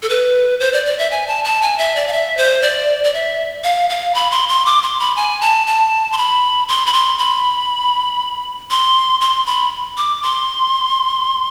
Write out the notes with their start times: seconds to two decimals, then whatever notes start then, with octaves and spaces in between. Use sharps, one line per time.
0.03 A4
0.09 B4
0.60 C5
0.73 D5
0.86 D5
0.99 E5
1.11 G#5
1.27 A5
1.44 A5
1.62 G#5
1.78 E5
1.96 D5
2.08 F5
2.12 E5
2.37 C5
2.62 D5
3.04 D5
3.14 E5
3.64 F5
3.90 F5
4.15 B5
4.31 C6
4.49 C6
4.66 D6
4.83 C6
5.00 B5
5.16 G#5
5.41 A5
5.67 A5
6.12 C6
6.17 B5
6.68 C6
6.86 B5
6.93 C6
7.19 B5
8.70 C6
9.21 C6
9.46 B5
9.97 D6
10.23 C6